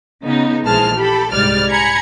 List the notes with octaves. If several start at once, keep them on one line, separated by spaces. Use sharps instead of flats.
C#3 B3 D#4
A#1 E3 G#3 C5 A5 F6
G4 A4 B5
C2 G#2 G3 D5 F6 A6
G#5 A#5 B5 G#6 C#7